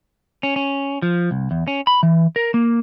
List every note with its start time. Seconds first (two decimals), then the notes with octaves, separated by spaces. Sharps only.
0.43 C#4
0.56 C#4
1.02 F3
1.31 C2
1.51 E2
1.68 C#4
1.87 B5
2.03 E3
2.36 A#4
2.54 A#3